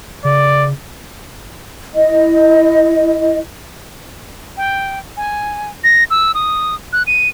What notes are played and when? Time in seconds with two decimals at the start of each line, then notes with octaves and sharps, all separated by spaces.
0.25 C#3 D5
1.95 E4 D#5
4.57 G5
5.17 G#5
5.84 A#6
6.10 E6
6.35 D#6
6.93 F#6
7.07 D#7